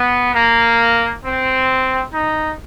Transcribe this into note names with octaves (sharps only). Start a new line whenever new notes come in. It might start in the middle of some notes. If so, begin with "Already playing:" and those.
Already playing: B3
A#3
C4
D#4